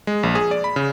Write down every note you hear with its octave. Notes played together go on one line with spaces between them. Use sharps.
G#3
A#1
G#4
D5
B5
C#3